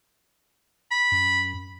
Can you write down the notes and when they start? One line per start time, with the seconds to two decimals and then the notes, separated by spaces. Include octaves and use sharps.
0.91 B5
1.12 F#2